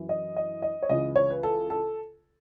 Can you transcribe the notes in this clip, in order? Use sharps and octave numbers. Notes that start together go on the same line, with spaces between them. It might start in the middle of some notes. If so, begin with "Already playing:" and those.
Already playing: F#2 E3
D#5
D#5
D#5
C#5
C#2 C#3 E3 D#5
C#5
B4
A4
A4